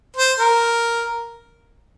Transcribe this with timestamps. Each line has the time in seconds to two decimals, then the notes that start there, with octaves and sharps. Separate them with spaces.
0.17 C5
0.40 A#4